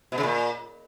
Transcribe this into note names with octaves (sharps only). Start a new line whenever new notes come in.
B2
C#3
A#2